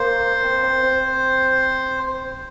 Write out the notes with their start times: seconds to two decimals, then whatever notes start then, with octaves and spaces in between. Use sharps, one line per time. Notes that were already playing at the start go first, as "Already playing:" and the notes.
Already playing: A#3 C5
0.43 C4
0.63 C4
0.83 C4